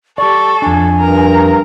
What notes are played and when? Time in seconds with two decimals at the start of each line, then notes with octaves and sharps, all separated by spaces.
0.18 G4 A4 D5 C#6
0.62 F2 D4 G#5
1.00 G2 A#4 A#5